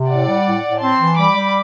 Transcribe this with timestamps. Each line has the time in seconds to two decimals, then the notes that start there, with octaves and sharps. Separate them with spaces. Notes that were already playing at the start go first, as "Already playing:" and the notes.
Already playing: C3
0.09 A2 D5 F#5
0.28 G3
0.45 A2
0.64 A2
0.82 C4 A5 C6
0.99 E3
1.17 G3 B5 D6
1.35 G3